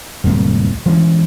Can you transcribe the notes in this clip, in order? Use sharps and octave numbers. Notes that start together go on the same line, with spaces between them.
D1 C2 F2 A#3
E3 G#3 C#4